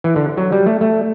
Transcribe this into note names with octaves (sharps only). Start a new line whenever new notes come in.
E3
D3
F#3
G3
A3
A3